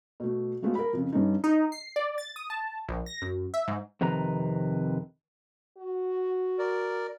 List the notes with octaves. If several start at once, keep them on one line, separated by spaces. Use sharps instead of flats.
B2 A3
F#3 G#3 A3 B3 F4
A#4 B5
F2 C#3
G2 C#4 D#4
D#4
C7
D5
A6
D#6
A5
A#1
A#6
F#2
E5
G#2
F2 C3 D#3 B4 A#5
F#4
A#4 D5